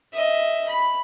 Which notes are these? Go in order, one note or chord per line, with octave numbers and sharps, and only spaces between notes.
D#5 E5
B5